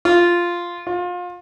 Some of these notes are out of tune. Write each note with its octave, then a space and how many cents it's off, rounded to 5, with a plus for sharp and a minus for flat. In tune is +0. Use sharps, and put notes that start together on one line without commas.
F4 -5
F4 +30